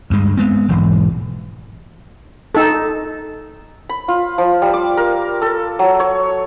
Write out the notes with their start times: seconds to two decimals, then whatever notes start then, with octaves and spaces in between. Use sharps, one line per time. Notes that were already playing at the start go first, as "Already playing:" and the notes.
0.10 D2 G2 G#3
0.37 G#3 B3 C4
0.68 E1 B1 G#2 E3
2.55 D#4 A4
3.89 B5
4.08 F4
4.38 F3
4.62 G3
4.73 D6
4.97 A#4
5.42 A4
5.79 F#3
6.00 C#5